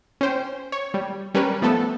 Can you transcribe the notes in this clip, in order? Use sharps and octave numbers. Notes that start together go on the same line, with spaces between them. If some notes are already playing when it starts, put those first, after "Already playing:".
C#4 C5 G5
C#5
G3
G3 C#4 A#4 B4
F3 A3 B3 A4